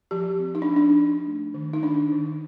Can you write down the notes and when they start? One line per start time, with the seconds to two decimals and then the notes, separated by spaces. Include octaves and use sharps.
0.11 F3 G4
0.39 C4
0.55 D#4
0.62 D4
0.68 F3
0.76 D4
0.97 D4
1.27 A3
1.54 D#3
1.73 D#4
1.83 D#3 D4
2.12 D#3